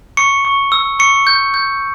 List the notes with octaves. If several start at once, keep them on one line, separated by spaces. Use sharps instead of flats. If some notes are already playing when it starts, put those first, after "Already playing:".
C#6 C#7
C#6
E6
C#6 C#7
G6
G6